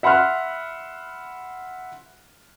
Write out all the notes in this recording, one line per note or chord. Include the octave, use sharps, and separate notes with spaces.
E5 F#5 B5 C6 F6 F#6